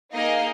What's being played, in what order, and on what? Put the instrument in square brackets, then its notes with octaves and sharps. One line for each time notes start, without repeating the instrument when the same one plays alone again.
[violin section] A#3 D#4 G#4 D#5 F5